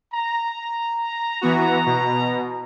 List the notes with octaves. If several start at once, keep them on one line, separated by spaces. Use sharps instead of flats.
A#5
E3 B3 F#4
B2